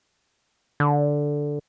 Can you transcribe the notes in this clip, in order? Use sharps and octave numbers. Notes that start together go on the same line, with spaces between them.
D3